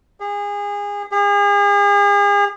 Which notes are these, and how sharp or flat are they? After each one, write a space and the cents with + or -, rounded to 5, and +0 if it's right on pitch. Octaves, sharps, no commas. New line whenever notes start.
G#4 -30
G#4 -40